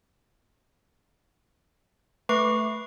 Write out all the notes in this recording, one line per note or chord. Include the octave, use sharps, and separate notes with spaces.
A3 B4 C#6 D6 C7